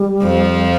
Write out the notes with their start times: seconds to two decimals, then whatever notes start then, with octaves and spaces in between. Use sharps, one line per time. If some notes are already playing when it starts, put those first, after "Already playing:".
Already playing: G3
0.23 F2 F3